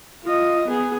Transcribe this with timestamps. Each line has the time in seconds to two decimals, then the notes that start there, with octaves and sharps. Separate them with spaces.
0.24 F4 D#5
0.68 B3 G#4